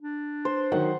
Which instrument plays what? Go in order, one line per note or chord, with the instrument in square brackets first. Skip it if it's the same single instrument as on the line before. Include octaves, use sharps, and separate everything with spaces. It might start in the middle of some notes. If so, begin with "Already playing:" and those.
[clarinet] D4
[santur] C5
[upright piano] D#3 F#3 [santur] F#5